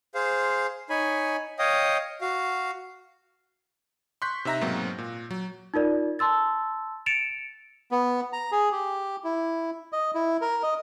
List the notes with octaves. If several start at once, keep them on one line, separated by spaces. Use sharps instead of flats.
G#4 C5 F5
D#4 C#5 G#5 B5
C#5 D#5 F5 G5 D#6
F#4 F5
C6 C#6 F#6 G6 B6
C3 D#4 E5 A#5 A#6
G#2 B2 F#3 A#3 C4
A#2
F#3
D#4 F4 A#4 D5
A5 C6 E6 A6
A6 C#7 D7 E7 F7
B3
A#5
G#4
G4
E4
D#5
E4
A#4
D#5